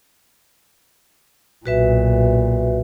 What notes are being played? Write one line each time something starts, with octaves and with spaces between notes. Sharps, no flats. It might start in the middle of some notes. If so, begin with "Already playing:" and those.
B1 A#2 F#4 B4 E5